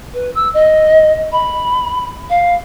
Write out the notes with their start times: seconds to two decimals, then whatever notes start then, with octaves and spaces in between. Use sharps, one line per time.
0.13 B4
0.35 E6
0.54 D#5
1.32 B5
2.29 F5